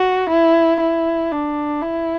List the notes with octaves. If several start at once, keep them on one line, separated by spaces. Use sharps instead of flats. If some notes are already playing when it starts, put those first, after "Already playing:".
Already playing: F#4
E4
E4
D4
E4